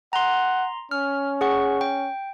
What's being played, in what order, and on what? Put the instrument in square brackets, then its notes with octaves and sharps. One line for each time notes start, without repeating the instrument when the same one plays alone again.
[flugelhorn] F#5 [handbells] A#5 C6
[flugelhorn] C#4 [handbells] F6
[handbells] G#4 F#5 C#6
G5